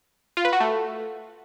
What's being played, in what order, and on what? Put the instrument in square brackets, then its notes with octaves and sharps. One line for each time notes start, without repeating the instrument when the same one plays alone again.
[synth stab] F4
B4
F#4
A3